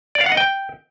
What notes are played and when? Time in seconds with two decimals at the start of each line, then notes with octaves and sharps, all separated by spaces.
0.15 D5
0.21 F5
0.26 F#5
0.32 D#5
0.37 G5